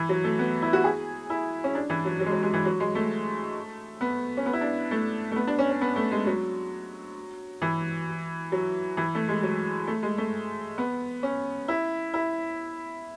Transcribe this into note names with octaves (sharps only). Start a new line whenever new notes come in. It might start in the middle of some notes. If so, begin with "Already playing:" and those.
Already playing: E3
F#3
A3
B3
E4
F#4
G#4
E4
C#4
D4
E3
F#3
F#3
G#3
F#3
G#3
E3
F#3
G#3
A3
B3
C#4
B3
E4
D4
A3
A3
B3
D4
C#4
C#4
B3
A3
G#3
F#3
E3
F#3
E3
A3
G#3
F#3
A3
G#3
A3
B3
C#4
E4
E4